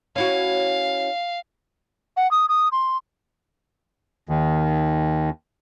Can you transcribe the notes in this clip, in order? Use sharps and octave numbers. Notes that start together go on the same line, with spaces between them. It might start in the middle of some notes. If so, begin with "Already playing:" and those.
C#4 E4 F#4 F5
F#5
D#6
D#6
C6
D#2 D#3